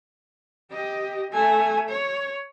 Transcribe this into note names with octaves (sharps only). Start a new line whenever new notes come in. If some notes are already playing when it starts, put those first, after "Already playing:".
G4 D#5
A3 G#5
C#5